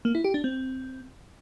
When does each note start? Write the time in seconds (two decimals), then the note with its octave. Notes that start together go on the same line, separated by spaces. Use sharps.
0.05 A#3
0.15 E4
0.24 G4
0.34 D4
0.44 C4